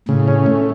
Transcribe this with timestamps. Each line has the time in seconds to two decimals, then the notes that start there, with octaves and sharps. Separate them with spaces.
0.09 A2 C#3
0.28 C#4
0.46 A3